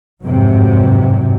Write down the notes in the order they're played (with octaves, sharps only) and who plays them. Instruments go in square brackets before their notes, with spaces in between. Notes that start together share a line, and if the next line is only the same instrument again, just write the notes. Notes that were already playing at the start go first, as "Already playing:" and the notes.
[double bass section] G1 F2 G#2 C3 F#3